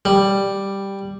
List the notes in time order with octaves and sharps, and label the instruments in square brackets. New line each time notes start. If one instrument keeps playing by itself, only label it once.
[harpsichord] G3